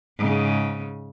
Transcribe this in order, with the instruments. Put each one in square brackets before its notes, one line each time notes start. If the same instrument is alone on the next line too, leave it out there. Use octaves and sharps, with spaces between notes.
[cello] G#2 C#3